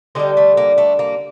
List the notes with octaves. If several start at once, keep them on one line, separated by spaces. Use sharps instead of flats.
D3 G3 D#4 G4
A3
A#3
A3
A#3